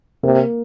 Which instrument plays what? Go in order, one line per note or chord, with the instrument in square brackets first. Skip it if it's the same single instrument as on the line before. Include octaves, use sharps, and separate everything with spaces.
[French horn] C3 [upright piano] A#3